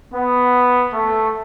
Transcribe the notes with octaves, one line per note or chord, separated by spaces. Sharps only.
B3
A3